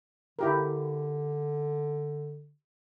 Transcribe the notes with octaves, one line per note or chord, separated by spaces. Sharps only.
D3 E4 G4 A#4